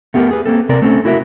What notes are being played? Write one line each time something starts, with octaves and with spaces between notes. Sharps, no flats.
A3 B3 G4 G#4 A#4
G#4 B4
A#3 C4 A4
C3 C4 A#4 D5
A3 C4 C#4 A4
E4 F#4 A#4 D#5 E5